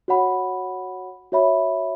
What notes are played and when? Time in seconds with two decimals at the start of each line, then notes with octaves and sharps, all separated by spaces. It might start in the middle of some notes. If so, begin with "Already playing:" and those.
0.08 F#4 C#5 F#5 B5
1.32 F#4 C#5 E5 B5